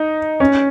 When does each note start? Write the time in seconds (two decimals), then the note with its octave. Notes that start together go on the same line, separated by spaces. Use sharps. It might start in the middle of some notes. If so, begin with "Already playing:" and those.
Already playing: D#4
0.40 C#4